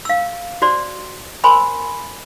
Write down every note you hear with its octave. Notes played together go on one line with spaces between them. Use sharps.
F5 E6
F#4 C5 D5 C6
A#4 C5 G#5 B5 C6 E6